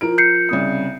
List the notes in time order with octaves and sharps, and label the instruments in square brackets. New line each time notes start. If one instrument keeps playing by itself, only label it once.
[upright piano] F3 A#4 D7
[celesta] G6 C7 C#7
[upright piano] C2 C#3 D#6